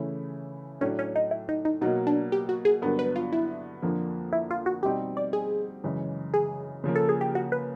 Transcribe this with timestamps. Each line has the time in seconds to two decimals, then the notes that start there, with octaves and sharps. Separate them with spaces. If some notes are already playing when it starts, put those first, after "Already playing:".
Already playing: C#3 E3 A3 C#4 E4
0.81 A2 F#3 A3 C#4 D4
0.99 C#4
1.16 D#4
1.31 E4
1.49 D#4
1.65 D#4
1.81 B2 F#3 A#3 D#4
2.07 D4
2.32 G4
2.49 F#4
2.65 G#4
2.82 G2 D3 F#3 B3 A#4
2.99 B4
3.16 F4
3.32 E4
3.82 F2 D3 F3 A#3
4.33 E4
4.51 F4
4.66 F#4
4.83 B2 G3 C4 D#4 G4
5.17 D5
5.33 G#4
5.84 F#2 C#3 E3 G#3
6.34 G#4
6.84 C#3 F3 A#3
6.95 A4
7.09 G#4
7.21 G4
7.35 F#4
7.52 B4